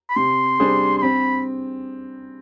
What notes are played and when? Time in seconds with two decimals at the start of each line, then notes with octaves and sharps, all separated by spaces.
0.10 B5
0.16 C3 C6
0.60 G3 D4 G#4 C5
0.98 C6
1.02 C4 B5